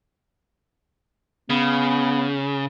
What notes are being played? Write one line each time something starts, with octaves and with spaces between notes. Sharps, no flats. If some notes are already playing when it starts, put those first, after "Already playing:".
C#3 B3